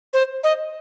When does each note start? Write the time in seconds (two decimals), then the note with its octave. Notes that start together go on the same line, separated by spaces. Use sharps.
0.13 C5
0.43 D#5